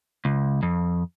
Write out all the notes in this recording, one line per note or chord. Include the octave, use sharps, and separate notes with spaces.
C#2
F2